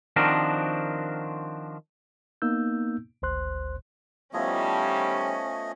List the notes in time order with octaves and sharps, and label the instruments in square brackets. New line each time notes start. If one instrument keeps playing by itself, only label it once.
[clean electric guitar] D#3 F3 C4 D4 F#4 A#4
[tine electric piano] A#3 B3 D#4 E6 G6
G#1 D2 C5 C6 F#6
[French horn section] D#3 G3 [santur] F3 B3 E4 [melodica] A3 D#5 [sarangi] C#4